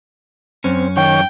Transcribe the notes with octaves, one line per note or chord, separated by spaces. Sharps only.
F#2 C4 C#4
D#3 C#5 G5